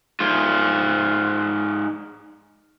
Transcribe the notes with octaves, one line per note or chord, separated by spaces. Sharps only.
G#2 F4